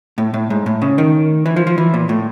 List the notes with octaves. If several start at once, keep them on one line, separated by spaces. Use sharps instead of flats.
A2
A2
G#2
A2
C#3
D#3
E3
F3
F3
E3
A#2
A2